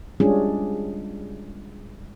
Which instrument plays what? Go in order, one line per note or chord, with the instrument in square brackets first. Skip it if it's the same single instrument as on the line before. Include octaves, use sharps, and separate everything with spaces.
[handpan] G3 G#3 C#4 D4 F4 G#4